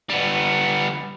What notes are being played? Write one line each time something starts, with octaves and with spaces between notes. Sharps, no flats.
G3 B3